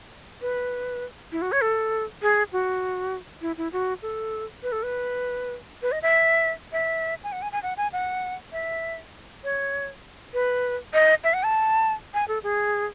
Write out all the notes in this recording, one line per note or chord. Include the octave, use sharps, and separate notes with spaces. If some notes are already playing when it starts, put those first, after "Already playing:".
B4
E4
F#4
C#5
A4
G#4
F#4
E4
E4
F#4
A4
B4
A4
B4
B4
D#5
E5
E5
G#5
F#5
G#5
G#5
F#5
G#5
F#5
E5
C#5
B4
D#5
E5
F#5
A5
G#5
A4
G#4